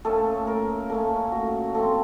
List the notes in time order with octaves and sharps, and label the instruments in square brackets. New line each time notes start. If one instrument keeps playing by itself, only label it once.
[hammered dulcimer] A#2 A3 C#4 [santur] A4
[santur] A#4
[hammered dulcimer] A#2 A3 C#4 [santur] A4
[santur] F#4
[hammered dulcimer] F3 A3 C4 [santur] A4